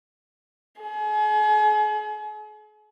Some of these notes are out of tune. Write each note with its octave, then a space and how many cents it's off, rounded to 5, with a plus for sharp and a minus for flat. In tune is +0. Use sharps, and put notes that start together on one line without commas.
G#4 +40